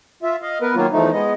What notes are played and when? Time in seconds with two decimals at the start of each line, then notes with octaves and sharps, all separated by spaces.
0.23 F4 E5
0.42 D#5 F5
0.61 B3 A#4 B4
0.75 D#3 F#3 A#3 F4
0.92 E2 F3 A3 D#4
1.13 G#3 B3 D#5